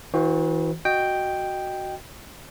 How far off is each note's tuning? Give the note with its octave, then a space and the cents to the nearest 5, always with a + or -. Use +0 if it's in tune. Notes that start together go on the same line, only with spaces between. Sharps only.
E3 -40 F#4 -20 C5 +0
F#4 +0 D#5 -10 G5 +0